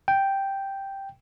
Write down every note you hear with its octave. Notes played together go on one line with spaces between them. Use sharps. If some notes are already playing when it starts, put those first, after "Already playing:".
G5